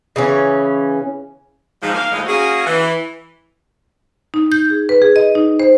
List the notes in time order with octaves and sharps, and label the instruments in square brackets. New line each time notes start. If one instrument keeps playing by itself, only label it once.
[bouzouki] C#3 E3 C#4
[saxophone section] G#2 F3
A#3 F5
D#2 A2 F3 G#3 A3 D#4
A#3 C#4 F#4 G#4
E3
[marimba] D#4
G6
G#4
B4
G#4
D#5
D#4
C5